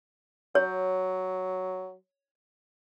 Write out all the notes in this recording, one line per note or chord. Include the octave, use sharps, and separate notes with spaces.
F#3 C#5